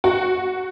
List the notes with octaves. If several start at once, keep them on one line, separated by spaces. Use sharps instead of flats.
F#4